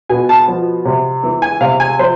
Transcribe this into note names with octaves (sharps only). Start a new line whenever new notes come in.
B2 G#5
A5
F3
C3
E3
G#5
C3 F5
G#5
F3 C5